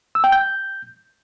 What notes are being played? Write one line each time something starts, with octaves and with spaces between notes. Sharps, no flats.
E6
G5
G6